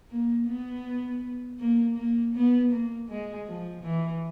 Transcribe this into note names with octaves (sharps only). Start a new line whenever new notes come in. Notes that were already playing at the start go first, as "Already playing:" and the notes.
A#3
B3
A#3
A#3
B3
A#3
G#3
F3
E3